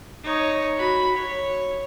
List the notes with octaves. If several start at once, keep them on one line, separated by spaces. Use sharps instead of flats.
D#4 C#5
F#4 B5
C#5